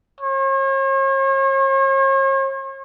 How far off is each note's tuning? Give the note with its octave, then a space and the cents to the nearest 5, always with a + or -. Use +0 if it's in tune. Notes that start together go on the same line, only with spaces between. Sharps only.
C#5 -45